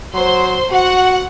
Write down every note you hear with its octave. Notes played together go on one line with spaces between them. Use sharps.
F#3 C5 C6
F#4 F#5